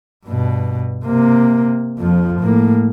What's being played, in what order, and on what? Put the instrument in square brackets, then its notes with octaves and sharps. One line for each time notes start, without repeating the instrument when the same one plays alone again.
[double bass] G2 B2
C3 A#3
F2 F3
A2 A#3